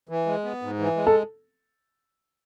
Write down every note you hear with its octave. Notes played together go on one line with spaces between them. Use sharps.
E3
G#3
B3
G#2
E3
G#3
A4